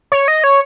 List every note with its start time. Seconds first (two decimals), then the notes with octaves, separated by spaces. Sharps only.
0.12 C#5
0.28 D#5
0.44 C#5